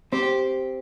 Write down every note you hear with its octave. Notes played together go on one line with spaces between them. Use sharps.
C4 G4